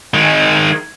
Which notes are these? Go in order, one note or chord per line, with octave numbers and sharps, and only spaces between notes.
D#3 G#3